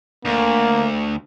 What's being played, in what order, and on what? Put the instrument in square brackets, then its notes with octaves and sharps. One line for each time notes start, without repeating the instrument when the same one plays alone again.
[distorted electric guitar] D2 [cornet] A#3